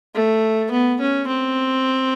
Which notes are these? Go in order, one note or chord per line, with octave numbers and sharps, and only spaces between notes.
A3
B3
C#4
C4